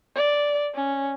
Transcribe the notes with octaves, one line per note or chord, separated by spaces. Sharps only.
D5
C#4